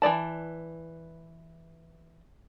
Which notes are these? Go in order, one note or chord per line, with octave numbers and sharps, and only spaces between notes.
E3 F#3 D5 A5